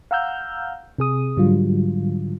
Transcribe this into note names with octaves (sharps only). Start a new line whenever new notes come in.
F5 F#5 A#5 E6 F6 G6
C3 G#4 D#6
G#2 D3 F#3 G3 F4